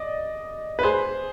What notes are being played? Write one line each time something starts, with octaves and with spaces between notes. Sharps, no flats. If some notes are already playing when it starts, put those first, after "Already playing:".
Already playing: D5 D#5
B4
G#4 C5